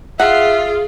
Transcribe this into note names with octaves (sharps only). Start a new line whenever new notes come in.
F4 G#4 E5 F#5